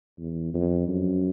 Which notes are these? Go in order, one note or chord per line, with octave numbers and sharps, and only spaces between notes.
E2
F2
F#2